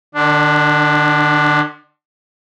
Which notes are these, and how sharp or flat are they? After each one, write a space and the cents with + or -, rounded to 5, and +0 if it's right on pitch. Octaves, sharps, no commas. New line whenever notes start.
D3 +45 D4 +0